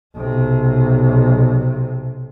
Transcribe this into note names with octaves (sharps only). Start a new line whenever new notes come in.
B1 C3